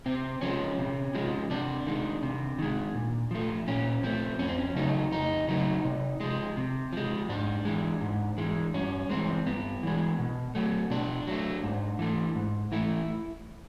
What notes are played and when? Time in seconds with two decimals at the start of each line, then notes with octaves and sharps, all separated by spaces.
0.06 C3 C4
0.41 F3 G#3 C#4
0.79 C3
1.15 F3 G#3
1.50 C3 D4
1.87 D#3 G#3
2.23 C3
2.59 D#3 G#3
2.95 A#2
3.31 F3 A3
3.68 A#2 C#4
4.03 F3 A3 C4
4.39 F2 C#4
4.49 C4
4.58 C#4
4.75 C#3 F#3 A3 D#4
5.12 F2 D#4
5.48 C#3 F#3 A3 D#4
5.84 C3
6.21 F3 G#3
6.57 C3
6.93 F3 G#3
7.29 G#2 D4
7.65 E3 G#3
8.01 G#2
8.38 E3 G#3
8.74 G2 C#4
9.10 E3 G#3 C4
9.46 G2 B3
9.83 E3 G#3
10.19 B2
10.55 F#3 A3
10.90 B2 D4
11.27 F#3 A3
11.64 G#2
11.99 E3 A3
12.36 G#2
12.72 E3 A3 E4